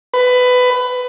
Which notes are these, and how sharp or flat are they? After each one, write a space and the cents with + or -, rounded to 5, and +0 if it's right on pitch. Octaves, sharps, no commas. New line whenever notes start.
B4 +15